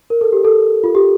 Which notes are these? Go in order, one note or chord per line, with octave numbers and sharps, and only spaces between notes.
A#4
A4
G4
A4
F4
G4